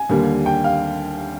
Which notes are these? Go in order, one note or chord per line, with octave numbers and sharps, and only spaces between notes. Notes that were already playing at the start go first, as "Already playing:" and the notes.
Already playing: G#5
D#2 D3 G3 A#3
G5
F5